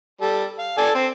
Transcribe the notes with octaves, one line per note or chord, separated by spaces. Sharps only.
G3 A4
F5
A4 D5 G#5
C4